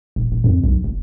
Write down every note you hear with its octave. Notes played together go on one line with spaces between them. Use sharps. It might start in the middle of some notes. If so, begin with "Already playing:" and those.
D#1
D#1
F2
B1
F#1